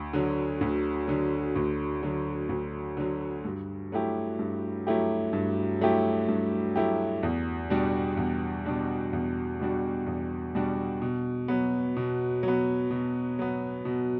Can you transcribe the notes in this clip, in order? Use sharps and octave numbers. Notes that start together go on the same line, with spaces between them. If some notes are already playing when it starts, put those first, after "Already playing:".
Already playing: D2
D3 F#3
D2
D3 F#3
D2
D3 F#3
D2
D3 F#3
G2
F#3 A3 E4 G4
G2
F#3 A3 E4 G4
G2
F#3 A3 E4 G4
G2
F#3 A3 E4 G4
E2
B2 G3 D4 F#4
E2
B2 G3 D4 F#4
E2
B2 G3 D4 F#4
E2
B2 G3 D4 F#4
B2
F#3 B3
B2
F#3 B3
B2
F#3 B3
B2